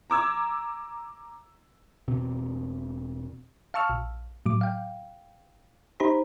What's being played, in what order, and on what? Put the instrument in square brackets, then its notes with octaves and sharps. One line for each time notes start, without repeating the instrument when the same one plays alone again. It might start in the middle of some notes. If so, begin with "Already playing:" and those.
[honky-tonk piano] A#5 D6 E6 G#6
[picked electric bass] E1 B2 C4
[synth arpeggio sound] F5 A5 C#6 E6 F6
A#1
A2 F#3 D6
F5 G5
D#4 G4 C5 A#5 B5